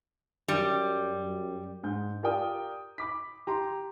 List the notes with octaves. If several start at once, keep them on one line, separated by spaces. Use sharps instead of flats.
F#2 G3
F#2
G#2 G6
F4 G4 A#4 D5 G5 D#6
B5 D6 B6
G4 A#5 C6